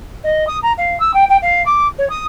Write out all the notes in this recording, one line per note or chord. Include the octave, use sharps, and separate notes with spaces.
D#5
D#6
A#5
F5
E6
G5
G5
F5
D6
C#5
D#6